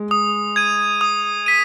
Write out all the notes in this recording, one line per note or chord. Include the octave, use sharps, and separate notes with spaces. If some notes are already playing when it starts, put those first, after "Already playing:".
Already playing: G#3
D#6
G#6 D#7
D#6
B6 D#7